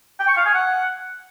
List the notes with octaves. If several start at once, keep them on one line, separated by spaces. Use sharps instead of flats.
G5
C#6
F5
G#5
F#5